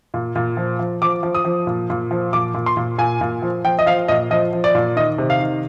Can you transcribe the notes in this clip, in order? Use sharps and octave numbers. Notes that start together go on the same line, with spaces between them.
A#2
A#2
F3
F3
F3 D6
F3
D#6
F3
A#2
A#2
F3
A#2 D6
A#2
C6
A#2
A#2 G#5
A#2
F3
F3 G5
D#5
F3 F5
A#2 D#5
F3 D#5
F3
D5
A#2
D#3 D#5
C3
F5
D#3